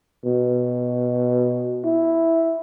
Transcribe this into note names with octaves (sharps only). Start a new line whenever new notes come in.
B2
E4